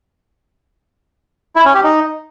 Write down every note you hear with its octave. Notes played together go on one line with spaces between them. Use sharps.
E4
C#4
G4
D#4